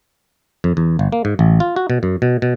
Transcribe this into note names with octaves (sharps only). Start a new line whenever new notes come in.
F2
E2
G1
A#3
G#2
A1
F4
F#4
B2
F#2
B2
B2